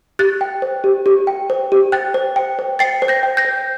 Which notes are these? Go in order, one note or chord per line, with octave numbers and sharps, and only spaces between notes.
G4 F#6 A6
G5
C5
G4
G4
G5
C5
G4
G5 F#6 A6
C5
G5
C5
G5 A6 C7
C5
G6 A#6
G5
G6 A#6
C5